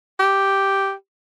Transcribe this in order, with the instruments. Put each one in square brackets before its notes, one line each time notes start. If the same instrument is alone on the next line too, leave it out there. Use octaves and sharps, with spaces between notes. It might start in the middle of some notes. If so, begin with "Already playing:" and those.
[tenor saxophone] G4